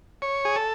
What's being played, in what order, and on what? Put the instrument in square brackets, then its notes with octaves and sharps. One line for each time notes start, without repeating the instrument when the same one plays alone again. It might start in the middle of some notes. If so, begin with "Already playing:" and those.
[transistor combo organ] C#5
G#4
A4